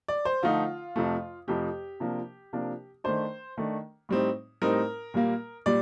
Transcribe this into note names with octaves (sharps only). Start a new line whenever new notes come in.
D5
C5
D3 F3 A3 D#4 F4
F2 C3 F3 A3
F2 C3 F3 A3 G4
C3 F3 A#3 D4
C3 F3 A#3 D4
D#3 A3 D4 C5
D#3 A3 D4
A2 G3 C4 D#4
A2 G3 C4 D#4 A#4
A#2 G3 A#3
A#2 G3 D5